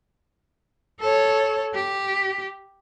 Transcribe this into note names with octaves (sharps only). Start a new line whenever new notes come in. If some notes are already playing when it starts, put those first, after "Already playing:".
A4 C#5
G4